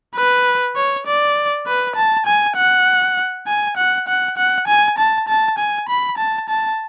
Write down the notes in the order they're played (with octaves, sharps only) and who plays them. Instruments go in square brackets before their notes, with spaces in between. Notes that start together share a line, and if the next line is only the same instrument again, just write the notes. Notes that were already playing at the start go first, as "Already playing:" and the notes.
[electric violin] B4
C#5
D5
B4
A5
G#5
F#5
G#5
F#5
F#5
F#5
G#5
A5
A5
G#5
B5
A5
A5